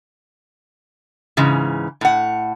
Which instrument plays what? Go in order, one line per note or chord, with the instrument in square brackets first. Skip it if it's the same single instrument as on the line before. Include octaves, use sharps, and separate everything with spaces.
[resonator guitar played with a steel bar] G#2 C#3 E3
A2 F#5